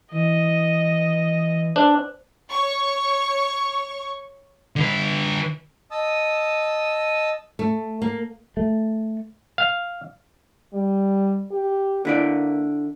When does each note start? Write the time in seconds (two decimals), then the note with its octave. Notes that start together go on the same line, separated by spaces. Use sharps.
0.11 E3 D#5
1.76 D4 B4 C5
2.51 C#5 C#6
4.76 D3 B4
5.91 D#5 A5 D#6 E6
7.59 A3
8.02 A#3
8.57 A3
9.58 F5
10.73 G3
11.51 G4
12.05 D3 A#3 E4 D5